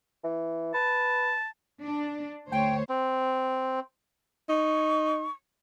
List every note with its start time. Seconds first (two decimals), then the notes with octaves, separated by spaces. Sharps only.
0.24 E3
0.74 B4 A5
1.83 D4
2.52 D2 C5 C#5 G5
2.89 C4
4.49 D#4 C#6